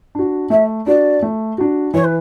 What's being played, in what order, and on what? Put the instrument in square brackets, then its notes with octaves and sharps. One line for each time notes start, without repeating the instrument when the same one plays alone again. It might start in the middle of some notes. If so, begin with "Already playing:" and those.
[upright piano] D4 F#4
[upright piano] A3 [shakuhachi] E5
[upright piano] D4 F#4 [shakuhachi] D5
[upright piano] A3
D4 F#4
[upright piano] E3 [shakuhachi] C#5
[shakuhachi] B4